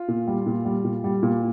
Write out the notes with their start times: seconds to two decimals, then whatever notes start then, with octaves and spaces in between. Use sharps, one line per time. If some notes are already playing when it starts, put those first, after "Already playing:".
Already playing: F4
0.08 A#2
0.27 G3
0.46 A#2
0.65 G3
0.85 A#2
1.04 G3
1.23 A#2